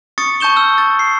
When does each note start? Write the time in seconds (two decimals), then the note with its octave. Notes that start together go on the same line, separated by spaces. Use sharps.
0.18 C#6 D#6 A6 C#7
0.40 A5 C#6 G6 E7 G7
0.56 E6 F6
0.78 A6
0.99 C7